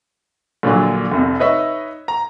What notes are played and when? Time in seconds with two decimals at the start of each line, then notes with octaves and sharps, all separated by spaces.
0.63 A#1 A#2 D3 F#3
1.12 F1 C2 C3
1.40 D#4 B4 C#5 D#5 E5
2.08 A#5